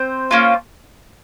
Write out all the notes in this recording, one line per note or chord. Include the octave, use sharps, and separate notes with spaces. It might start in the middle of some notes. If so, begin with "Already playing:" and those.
Already playing: C4 C5
A#3 C#4 F4